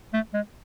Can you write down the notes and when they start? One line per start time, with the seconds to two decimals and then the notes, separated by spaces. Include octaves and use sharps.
0.13 A3
0.34 G#3